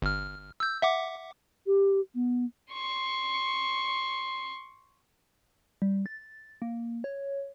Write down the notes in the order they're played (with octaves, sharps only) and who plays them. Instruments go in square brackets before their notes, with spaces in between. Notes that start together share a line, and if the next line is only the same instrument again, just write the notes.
[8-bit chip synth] G1 F6
E6 G6
E5 F#5 D6
[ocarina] G4
B3
[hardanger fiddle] C6 C#6
[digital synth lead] G3
A6
A#3
C#5